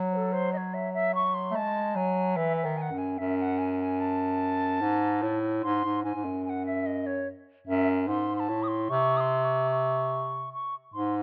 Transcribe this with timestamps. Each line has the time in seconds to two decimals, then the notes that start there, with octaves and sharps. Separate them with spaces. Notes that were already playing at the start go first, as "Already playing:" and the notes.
Already playing: F#3
0.12 C5
0.17 A4
0.33 C5
0.53 D#5
0.57 C#5
0.74 E5
0.94 E5
1.15 C#6
1.34 C6
1.51 A3
1.55 G#3 A5
1.95 F#3 G#5
2.36 E3 E5
2.57 E5
2.64 D#3
2.77 G#5
2.82 F#5
2.91 F#2
2.98 G#5
3.18 F#2 E5
3.39 G#5
3.42 F#5
3.59 G#5
3.80 G#5
4.00 A5
4.81 G#2
5.22 A2
5.63 G#2 C6
5.84 G#2
6.04 G#2 G#5
6.15 G#2
6.24 F#2
6.45 G#5
6.50 F#5
6.66 E5
6.86 D#5
7.06 C#5
7.67 F#2 E5
8.08 G#2 C6
8.36 C6
8.40 A5
8.49 A2
8.63 D#6
8.68 C6
8.90 C3 C#6
9.17 D#6
9.20 C6
9.45 C#6
9.71 C#6
10.53 C#6
10.94 G#2 C6